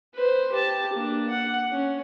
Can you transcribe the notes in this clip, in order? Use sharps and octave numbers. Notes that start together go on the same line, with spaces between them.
B4 C5
G4 A5
A#3 D4
F#5
C#4